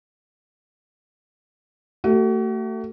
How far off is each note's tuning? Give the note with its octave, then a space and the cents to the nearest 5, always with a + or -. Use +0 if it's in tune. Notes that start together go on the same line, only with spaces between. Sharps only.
A3 +30 F#4 +40